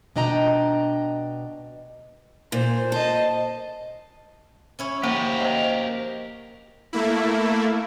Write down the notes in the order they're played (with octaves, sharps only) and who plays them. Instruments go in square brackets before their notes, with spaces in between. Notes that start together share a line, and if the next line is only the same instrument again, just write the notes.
[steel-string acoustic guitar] B2 D4 D#5 G5 A#5
[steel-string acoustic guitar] A#2 [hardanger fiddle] C5
[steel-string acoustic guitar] C5 [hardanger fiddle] D#5 A5
[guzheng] C#4 E4 C#5
[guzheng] F3 [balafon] A#3 [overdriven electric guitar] G4 A#4
[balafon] C5 D#5
[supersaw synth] A3 A#3 E4